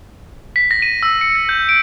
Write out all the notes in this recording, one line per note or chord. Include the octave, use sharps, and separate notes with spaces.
B6
A#6
D#7
E6
C#7
A#6
G6
D7